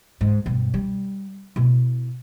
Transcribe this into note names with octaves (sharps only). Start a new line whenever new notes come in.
G#2
G2 B2
G3
B2 E4